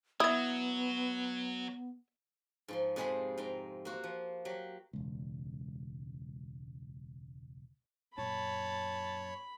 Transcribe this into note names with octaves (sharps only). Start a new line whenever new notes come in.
F#3 B3 E4 D#6 G#6
G#2 F3 C6
F2 C3 G#3 G#4 C5 B5
G#2 G5 A#5
A#3 F#4 C5
F3
F#3 G4
E1 C#2
F#2 A#2 C#5 A5 B5